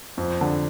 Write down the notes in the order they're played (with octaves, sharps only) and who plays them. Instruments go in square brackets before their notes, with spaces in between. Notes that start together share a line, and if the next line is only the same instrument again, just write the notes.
[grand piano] F2
D3